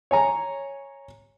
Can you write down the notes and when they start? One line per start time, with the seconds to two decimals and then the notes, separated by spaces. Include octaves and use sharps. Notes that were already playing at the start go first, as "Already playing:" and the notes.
0.11 C#5 G#5 A#5